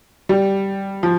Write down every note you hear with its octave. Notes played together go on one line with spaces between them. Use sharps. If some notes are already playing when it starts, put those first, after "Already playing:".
G3
F3